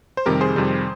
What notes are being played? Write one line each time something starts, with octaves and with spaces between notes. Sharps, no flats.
C5
F2 C3 D#3 G3 G4 A#4
G#4 C5
F2 C3 D#3 G3